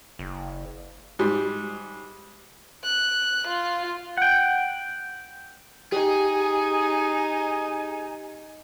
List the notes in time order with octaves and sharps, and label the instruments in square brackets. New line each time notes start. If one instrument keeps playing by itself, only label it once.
[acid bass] F#1
[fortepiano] G#2 G3
[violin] F#6
F4
[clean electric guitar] F#5 G5
[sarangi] D#4 [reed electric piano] G4 [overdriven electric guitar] G#4 [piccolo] G#5